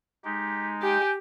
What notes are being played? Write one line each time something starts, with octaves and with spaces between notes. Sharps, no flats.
G#3 D#4 G4
G4 G5 G#5